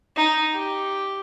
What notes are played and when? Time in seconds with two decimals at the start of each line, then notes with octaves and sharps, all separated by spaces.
0.16 D#4
0.54 G4